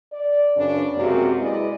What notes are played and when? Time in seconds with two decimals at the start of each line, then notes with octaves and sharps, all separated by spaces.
0.13 D5
0.57 F#2 C#3 C#4 D4 B4
0.97 F#2 C3 G#3 A#3 F#4 G4
1.38 G#3 E4 B4 D5 D#5